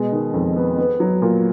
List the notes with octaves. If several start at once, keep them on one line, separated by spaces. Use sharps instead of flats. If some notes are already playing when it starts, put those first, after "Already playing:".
Already playing: B2 G#3
D#3
F2
B3
B3
F#3
A#2